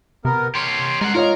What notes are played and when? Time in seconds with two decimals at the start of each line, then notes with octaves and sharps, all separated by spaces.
0.25 C3 B3 A#4
0.55 G4 C#5 C6
1.01 G#3 A#4 F#5
1.14 F4 A#4 C#5 D#5